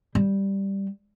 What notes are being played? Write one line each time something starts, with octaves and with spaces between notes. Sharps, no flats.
G3